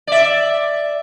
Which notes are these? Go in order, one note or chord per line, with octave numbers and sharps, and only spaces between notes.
D5 E5